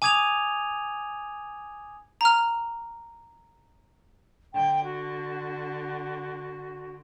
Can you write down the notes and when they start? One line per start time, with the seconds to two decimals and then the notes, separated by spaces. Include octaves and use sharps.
0.02 G#5 D6 D#6 G#6 D#7 F7
2.21 A#5 F6
4.54 D3 G5
4.84 F#4